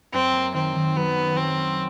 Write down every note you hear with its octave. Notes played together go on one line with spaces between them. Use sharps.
F#2 C4
A#3
D#3 C4
D#3
F#3 B3
C#4
F#3 C4
C#4